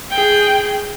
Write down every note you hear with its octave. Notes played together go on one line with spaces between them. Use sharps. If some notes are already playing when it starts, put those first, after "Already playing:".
G#4 G5